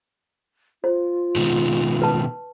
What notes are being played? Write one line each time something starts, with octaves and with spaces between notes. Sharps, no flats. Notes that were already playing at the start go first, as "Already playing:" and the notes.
F4 C5
B2 D#3 G#3
B4 A5